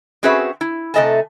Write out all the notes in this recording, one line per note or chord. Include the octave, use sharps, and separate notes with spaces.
C4 C#4 F#4 G#4 B4 E5
E4
C3 A3 D#5 G#5 A5